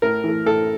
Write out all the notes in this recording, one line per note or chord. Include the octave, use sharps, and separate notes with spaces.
A2 A#4
E3 A3
A2 A4